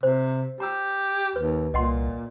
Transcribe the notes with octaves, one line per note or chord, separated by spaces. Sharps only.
C3 C5
G4 A#5 E6
D#2 B4
C2 A#2 D#5 F#5 C6